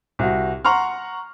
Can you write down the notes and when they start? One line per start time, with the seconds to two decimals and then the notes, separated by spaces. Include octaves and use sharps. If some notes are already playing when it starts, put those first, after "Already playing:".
0.19 C2 F#4
0.65 F#5 A#5 C6 C#6 F6